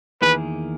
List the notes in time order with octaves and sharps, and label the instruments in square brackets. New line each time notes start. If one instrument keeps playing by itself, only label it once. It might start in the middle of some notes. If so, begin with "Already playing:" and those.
[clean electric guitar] E2 D#3 A#3 E4 G#4 [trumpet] B4